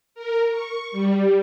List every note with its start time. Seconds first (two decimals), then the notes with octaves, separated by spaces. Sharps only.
0.15 A#4
0.51 C#6
0.91 G3